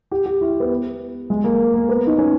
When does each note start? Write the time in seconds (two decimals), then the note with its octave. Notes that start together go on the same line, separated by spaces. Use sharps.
0.11 G4
0.26 G4
0.41 E4
0.60 B3
1.30 G#3
1.44 A#3
1.74 A#3
1.89 B3
2.07 D#4
2.18 C#4